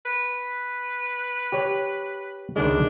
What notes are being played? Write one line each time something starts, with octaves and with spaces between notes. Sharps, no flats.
B4
G4 C#5
C#2 D#3 G#3 D4